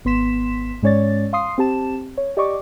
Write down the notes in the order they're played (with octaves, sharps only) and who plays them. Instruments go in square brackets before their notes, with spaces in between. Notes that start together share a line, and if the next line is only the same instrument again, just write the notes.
[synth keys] G#1 B3 C6 B6 E7
G#2 G#3 C#4 C#5 D5 A6
F5 C6 D#6 C7
C4 G4 A5 E7
C#5
G4 D5 D#5 C#6 D6